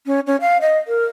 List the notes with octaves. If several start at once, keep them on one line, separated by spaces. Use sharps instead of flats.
C#4
C#4
F5
D#5
A#4